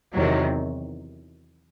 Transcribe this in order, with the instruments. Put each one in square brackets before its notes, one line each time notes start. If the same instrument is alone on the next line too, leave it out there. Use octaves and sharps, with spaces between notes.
[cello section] E2 C3 D#3 F#3